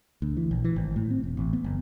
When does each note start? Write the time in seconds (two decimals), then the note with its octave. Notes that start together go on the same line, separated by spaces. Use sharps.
0.22 D2
0.37 E3
0.51 A#1
0.64 E3
0.76 G#1
0.96 A2
1.11 C4
1.24 E1
1.37 A1
1.53 B3
1.64 F#1